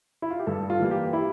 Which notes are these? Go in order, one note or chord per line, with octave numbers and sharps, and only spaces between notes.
E4
F4
G4
G2 A4
F4
E3 G3 A#3
G4
E4